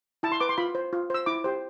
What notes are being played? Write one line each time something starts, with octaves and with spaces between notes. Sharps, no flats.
E4 A5
C6
B4 D6
C6
F4 B5
C5
F4
C5 E6
E4 D6
G4 C5